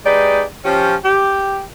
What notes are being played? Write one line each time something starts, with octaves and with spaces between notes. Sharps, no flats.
G#3 D#4 G4 G#4 B4 D5
F3 C#4 G4
G4